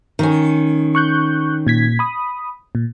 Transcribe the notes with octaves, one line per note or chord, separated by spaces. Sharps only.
D#3 C#4
C#6 F#6 G6
A#2 G#6 B6
B5 D#6
A#2